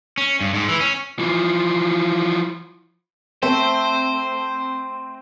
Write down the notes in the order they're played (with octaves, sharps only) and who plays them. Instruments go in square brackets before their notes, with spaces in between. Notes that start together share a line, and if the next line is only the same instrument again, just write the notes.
[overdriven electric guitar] C#4
G2
G#2
E3
C#4
[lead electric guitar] E3 F3
[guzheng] A3 [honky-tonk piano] C4 [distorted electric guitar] C5